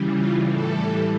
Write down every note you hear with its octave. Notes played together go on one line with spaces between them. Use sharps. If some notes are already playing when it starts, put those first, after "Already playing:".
Already playing: C#3 E3 G3
F4
A2 E3 G3 A4